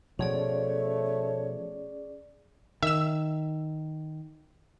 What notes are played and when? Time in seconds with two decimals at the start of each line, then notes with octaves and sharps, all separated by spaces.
0.19 B2 F3 A3 C#4 G#4 C#5 D5
2.83 D#3 E5 E6